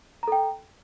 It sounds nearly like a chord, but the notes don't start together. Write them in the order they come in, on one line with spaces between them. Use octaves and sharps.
A#5 A4 G5